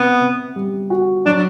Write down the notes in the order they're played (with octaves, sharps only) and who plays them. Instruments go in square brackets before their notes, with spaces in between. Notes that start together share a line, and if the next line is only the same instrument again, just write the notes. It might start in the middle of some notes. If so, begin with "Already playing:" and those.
Already playing: [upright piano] C3 [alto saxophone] B3
[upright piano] C3
G3
F#4
[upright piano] F#3 [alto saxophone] D4